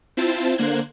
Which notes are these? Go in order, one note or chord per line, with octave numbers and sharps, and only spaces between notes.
C4 E4 F4 C5 A5
D3 A#3 C5 F#6 G#6